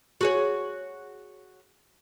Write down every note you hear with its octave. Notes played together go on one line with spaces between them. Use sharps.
F#4 G#4 C#5